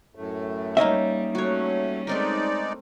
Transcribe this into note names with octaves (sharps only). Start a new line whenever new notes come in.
F#2 A2 A3
G3 A#3 C#4 D#4 D#5 E5
F#3 G3 A3 C#4 F#4 C#5
G#3 A3 C4 D#4 A#4 D5